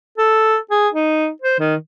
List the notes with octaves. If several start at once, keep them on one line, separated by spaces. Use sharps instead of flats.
A4
G#4
D#4
C5
D#3